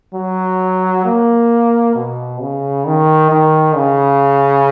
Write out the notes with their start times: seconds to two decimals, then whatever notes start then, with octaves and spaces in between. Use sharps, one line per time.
0.14 F#3
1.05 A#3
1.95 B2
2.41 C#3
2.86 D#3
3.31 D#3
3.76 C#3